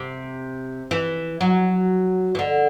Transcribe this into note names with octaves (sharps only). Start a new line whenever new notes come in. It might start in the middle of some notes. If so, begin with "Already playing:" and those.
Already playing: C3
E3
F#3
E3
D3